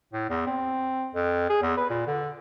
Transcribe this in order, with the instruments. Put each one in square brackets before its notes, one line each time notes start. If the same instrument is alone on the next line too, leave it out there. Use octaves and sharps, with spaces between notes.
[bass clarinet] A2
E2
C4
F2
G#4
E2
B4
A#2
D3